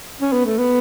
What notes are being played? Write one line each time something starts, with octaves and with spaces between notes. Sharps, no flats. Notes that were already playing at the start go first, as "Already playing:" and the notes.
C#4
B3
A3
B3